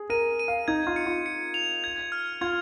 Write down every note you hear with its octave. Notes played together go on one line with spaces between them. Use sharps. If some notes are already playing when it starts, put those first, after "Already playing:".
Already playing: G#4
A#4 D#7
D#7
F5
D#4 G#6
F4
C#7
F4
C#7
F7
G#6
F6
F4 G#6